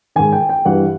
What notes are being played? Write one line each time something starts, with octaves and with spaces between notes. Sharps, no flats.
G#2 D#3 G#5
G5
G5
G2 E3 F#5